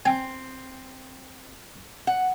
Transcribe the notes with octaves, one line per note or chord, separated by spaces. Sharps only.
C4 G5 G#5
F#5